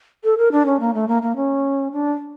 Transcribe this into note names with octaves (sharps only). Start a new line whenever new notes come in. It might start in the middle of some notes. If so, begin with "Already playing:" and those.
A4
A#4
D4
C#4
A#3
A3
A#3
A#3
C#4
D4